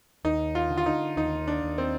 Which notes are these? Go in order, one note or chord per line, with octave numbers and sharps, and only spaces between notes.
D#2 D#4
F4
D3
F4
D#4
D#2 D#4
D4
D#2
C4